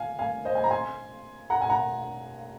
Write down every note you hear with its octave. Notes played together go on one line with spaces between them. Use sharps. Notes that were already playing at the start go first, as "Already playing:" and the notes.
Already playing: F5 G#5
F5 G#5
C5 D#5
G#5
A#5
G#5 C6
F#5 A#5
G#5
F#5 A#5